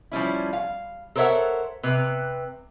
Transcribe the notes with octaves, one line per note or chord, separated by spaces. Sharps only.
F3 G3 C#4 E4
F5
A4 A#4 C5 C#5 E5 F#5
C3 B4